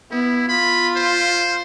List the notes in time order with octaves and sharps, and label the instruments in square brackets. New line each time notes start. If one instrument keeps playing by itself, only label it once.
[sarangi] B3 [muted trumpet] E4
[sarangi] F4 [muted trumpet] B5
[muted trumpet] C5